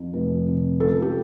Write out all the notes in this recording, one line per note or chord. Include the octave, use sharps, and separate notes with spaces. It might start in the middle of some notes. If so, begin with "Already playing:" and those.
Already playing: F2
F1
C3
C#2 A4
G4